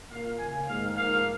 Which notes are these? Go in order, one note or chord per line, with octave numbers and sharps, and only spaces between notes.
A#2 A#3 F5
C#3 A#3 G#5
G#2 D#3 A#3 F5
G#2 F3 A#3 F5